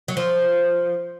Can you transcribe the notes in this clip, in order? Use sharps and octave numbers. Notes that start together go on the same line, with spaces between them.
F#3
F3